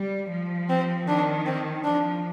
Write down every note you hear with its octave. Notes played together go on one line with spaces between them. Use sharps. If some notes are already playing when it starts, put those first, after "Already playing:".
Already playing: G3
F3
C4
D#3 D4
C4
F3 D4